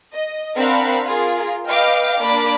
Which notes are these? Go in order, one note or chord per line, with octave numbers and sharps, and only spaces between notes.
D#5
C4 D4 A#4 F5 F#5 B5
F4 G#4 A#4
B4 D#5 F5 G5 D6 F6
A#3 D4 A#4 B5 D6